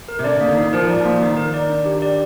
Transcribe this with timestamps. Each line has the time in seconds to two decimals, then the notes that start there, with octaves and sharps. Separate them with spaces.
0.08 A#4
0.19 C3
0.24 D3 D5
0.41 A#3
0.48 D#3
0.57 D#4
0.62 D#3
0.73 F3 A#4
0.89 D5
0.97 F3
1.05 A#3
1.21 D#3 D#4
1.37 A#4
1.54 D5
1.70 D4
1.86 G4
2.02 D5